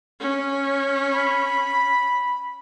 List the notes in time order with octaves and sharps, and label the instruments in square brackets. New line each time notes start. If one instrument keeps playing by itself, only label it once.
[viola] C#4
[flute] B5